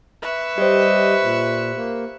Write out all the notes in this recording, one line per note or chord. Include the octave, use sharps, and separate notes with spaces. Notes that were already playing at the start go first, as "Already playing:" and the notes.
B4 E5 C#6
G3 G4 C5 D#5
A#2
A#3